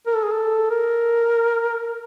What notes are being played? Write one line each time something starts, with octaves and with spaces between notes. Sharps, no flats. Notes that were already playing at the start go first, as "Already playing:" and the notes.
A#4
A4
G#4
A4
A#4